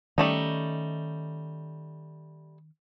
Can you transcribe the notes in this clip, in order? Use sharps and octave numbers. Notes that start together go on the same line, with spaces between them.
D#3 G3 A3 C#4 D#4